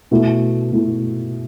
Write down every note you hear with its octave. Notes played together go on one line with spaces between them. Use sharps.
B2 A3 E4
B2 A3 E4